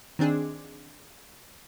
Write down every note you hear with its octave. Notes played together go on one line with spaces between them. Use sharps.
D#3 C4 D4 G#4